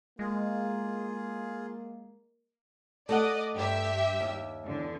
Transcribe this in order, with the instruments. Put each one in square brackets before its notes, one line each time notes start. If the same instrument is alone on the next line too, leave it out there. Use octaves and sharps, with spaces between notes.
[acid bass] G#3 [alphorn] A#3 [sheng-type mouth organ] F4 G#4
[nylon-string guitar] A3 A4 F#5 [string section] D5 D#5
[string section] G2 G4 E5
[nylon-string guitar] D#2
[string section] E2 D3